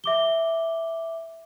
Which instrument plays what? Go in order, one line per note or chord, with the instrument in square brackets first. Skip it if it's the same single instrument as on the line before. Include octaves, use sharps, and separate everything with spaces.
[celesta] E5 D6 G7